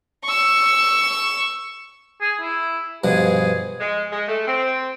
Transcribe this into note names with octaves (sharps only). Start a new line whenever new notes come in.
C#6 E6
G#4
E4
G2 B2 F3 G#4
G#3
G#3
A3
C4